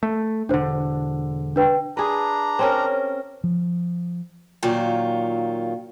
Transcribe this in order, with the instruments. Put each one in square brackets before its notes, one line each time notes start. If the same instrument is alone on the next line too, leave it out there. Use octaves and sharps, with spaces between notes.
[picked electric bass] A3
[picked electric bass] E1 D3 [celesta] D4 C5
[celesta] D4 B4 G5
[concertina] D4 A#5 [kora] G#4 B4
[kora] C4 C#4 A#4
[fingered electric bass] F3
[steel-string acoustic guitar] A#2 D#3 F#3 F4